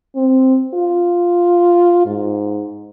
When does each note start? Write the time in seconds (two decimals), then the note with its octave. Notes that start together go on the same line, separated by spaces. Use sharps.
0.16 C4
0.74 F4
2.06 G#2